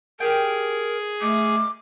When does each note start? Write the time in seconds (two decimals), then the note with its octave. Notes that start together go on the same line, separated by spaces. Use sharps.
0.20 G4 G#4 A#4 G5
1.21 A3 D#4 A#4 D6